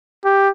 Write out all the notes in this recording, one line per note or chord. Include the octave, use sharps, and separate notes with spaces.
G4